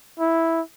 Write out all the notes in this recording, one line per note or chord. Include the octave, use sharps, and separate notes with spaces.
E4